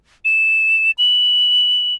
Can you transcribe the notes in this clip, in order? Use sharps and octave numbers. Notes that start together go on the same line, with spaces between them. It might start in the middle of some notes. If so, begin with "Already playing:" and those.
E7
F#7